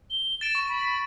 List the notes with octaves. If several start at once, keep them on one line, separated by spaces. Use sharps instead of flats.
G7
A6 D7 E7
C#6
B5